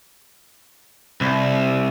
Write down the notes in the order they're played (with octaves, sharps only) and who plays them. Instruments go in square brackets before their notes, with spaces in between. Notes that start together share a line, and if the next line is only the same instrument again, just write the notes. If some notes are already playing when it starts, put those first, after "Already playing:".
[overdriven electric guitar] C2